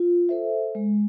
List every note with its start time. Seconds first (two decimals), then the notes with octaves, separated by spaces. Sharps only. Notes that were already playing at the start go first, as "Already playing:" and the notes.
Already playing: F4
0.29 A4 C5 E5
0.75 G#3